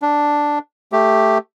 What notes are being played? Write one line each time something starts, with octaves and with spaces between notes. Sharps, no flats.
D4
A3 G4